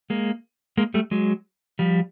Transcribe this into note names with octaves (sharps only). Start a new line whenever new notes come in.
G#3 A#3
G#3 A#3
G3 A3
F#3 G#3
F3 G3